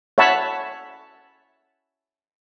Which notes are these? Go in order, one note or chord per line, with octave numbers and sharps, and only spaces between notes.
C#5 E5 F#5 A5 B5